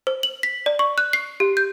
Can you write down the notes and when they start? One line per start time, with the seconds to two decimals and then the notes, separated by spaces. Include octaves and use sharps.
0.07 C5
0.23 F#7
0.43 B6
0.66 D5
0.79 C#6
0.98 F#6
1.13 C7
1.40 G4
1.57 G6